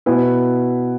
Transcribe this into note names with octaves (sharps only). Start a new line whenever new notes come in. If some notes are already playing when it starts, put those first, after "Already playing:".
B2 B3 E4 B4